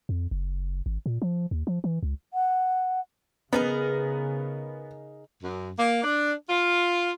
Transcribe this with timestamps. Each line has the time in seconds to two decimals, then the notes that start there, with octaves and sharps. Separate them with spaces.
0.09 F2
0.31 F#1
0.86 G#1
1.06 A#2
1.22 F3
1.51 D#2
1.67 F3
1.84 E3
2.03 C#2
2.34 F#5
3.53 C#3 B3 D#4 G#4 A#4
5.43 F#2
5.78 A#3
6.03 D4
6.49 F4